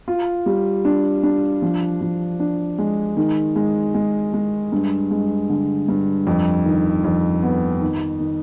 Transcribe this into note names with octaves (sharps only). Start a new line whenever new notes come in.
F4
G3
D4
D4
F3
F3
D4
G#3
D#3
G#3
G#3
G#3
G2
G#3
D3
G2
F2
D#3
F2
B3
D#3
D#3